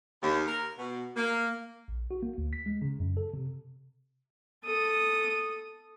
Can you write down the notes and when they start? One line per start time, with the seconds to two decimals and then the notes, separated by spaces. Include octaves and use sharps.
0.23 D#2
0.47 A#4
0.78 B2
1.16 A#3
1.88 A#1
2.11 F#4
2.23 A#3
2.38 D2
2.53 B6
2.66 G#3
2.82 C#3
3.00 F#2
3.17 A4
3.34 C3
4.65 A4 D#6